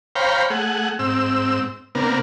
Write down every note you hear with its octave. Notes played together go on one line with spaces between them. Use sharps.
C5 C#5 F5 G5 A#5 B5
A3 G#4 F#5
G#2 C4 E6
C3 A#3 B3 D4 A#4